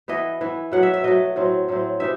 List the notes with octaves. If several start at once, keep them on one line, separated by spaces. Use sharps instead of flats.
E3 B3 E4 D#5
E3 B3 E4
B2 F#3 A3 F#5
E5
E5
B2 F#3 A3 D#5
A2 F#3 C4
A2 F#3 C4
C3 E3 B3 D#4 E5